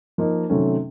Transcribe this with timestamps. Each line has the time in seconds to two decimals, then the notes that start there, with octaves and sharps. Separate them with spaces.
0.18 F3 A#3 D#4
0.50 C3 D#3 F#3 A3 C#4